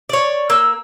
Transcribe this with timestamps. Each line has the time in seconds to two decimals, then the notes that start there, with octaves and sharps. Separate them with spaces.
0.09 C#5 D5
0.50 A#3 E6